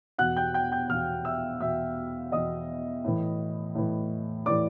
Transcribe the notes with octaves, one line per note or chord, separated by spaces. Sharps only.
E2 B2 F#5 F#6
G5 G6
G5 G6
G5 G6
E2 B2 F5 F6
E5 E6
E2 B2 E5 E6
E2 B2 D#5 D#6
A2 E3
A2 E3
A2 E3 D5 D6